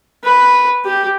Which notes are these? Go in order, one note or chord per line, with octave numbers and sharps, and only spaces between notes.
B4
G4